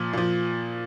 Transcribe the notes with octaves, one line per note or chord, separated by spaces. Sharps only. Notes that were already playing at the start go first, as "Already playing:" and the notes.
Already playing: A#2 F3
A#2 F3